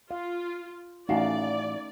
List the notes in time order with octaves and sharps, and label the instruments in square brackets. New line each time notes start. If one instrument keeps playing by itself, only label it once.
[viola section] F4 [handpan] F5
[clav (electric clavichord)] A1 [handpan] A3 C#4 D#4 [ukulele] F#4 A#4 F5 [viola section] D5